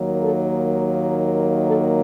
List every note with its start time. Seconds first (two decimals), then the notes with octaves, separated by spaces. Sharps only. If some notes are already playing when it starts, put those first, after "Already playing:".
Already playing: D#2 D#3 F#3 A#3
0.20 A4
1.66 A4